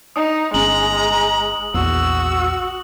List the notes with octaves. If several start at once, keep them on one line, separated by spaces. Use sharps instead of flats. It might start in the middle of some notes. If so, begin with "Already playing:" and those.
D#4 D#6
G1 G#3 C#4 A#5 F#7
A#1 E2 F#4 E6